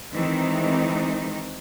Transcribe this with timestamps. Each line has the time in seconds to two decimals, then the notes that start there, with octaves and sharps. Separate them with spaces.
0.12 D#3 E3 G#3 C4 D#4